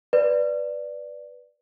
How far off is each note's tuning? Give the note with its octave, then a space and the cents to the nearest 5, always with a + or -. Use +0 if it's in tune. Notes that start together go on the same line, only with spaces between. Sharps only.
B4 +0 D5 +0